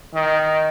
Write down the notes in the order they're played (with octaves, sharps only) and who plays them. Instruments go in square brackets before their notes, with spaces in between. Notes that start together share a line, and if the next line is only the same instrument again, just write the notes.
[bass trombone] D#3